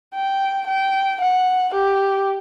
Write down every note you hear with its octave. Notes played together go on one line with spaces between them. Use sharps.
G5
G5
F#5
G4